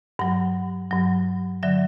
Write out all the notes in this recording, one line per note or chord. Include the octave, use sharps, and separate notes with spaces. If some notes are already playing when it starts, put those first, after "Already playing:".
G2 F#3 F#5
G2 F#3
D3 F#3 E5